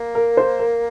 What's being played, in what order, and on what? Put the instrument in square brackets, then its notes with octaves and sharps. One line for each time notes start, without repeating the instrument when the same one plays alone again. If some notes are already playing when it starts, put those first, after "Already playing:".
Already playing: [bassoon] A#3
[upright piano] A#4
C5
A#4